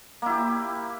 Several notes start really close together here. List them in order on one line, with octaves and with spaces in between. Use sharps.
A#3 E4 G4